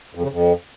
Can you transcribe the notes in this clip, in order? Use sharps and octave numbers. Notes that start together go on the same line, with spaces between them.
F2
C#3
F2